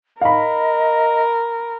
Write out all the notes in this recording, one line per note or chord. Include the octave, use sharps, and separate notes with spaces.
A#4 D#5 F5 B5